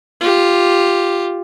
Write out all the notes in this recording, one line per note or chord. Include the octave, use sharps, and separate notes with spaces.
F4 G4